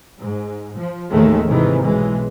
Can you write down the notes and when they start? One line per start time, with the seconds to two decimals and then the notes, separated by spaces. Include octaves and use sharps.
0.19 G#2
0.77 F3
1.11 A1 D#2 G#2 D#3 G#3 A3
1.47 G#2 C3 D#3 E3
1.81 B1 E3 G#3